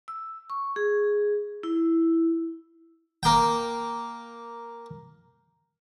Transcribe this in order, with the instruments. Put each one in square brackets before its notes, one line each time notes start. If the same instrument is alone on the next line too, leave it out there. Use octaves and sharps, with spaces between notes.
[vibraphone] E6
C#6
G#4
E4
[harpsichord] A#3 G5